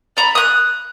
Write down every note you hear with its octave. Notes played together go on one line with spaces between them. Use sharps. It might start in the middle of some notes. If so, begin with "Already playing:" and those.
D5 A#5 B5
D#6 F#6